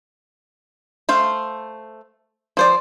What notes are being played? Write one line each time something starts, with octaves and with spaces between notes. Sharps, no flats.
A3 C5 F5
F3 C5 D5